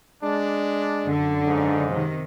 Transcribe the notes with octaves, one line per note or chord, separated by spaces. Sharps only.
G#3 D4
F#2 D3
G#2 C#3 D#4
C3 D#3